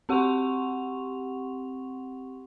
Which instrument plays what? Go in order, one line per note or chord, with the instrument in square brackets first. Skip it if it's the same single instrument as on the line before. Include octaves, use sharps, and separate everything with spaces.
[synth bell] C4 G4 F#5 C6 C#6 F7